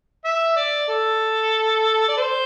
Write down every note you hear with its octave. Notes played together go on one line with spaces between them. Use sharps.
E5
D5
A4
D5
C5